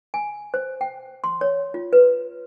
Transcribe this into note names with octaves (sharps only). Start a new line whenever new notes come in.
G#5
C5
G5
C6
C#5
F4
B4